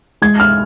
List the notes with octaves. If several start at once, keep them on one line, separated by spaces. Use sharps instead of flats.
G#3 G#6
F6